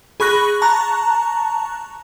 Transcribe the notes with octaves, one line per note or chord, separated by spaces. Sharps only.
G#4 B5 C#6 F#6 A#6
A5 A#5 C#6 F#6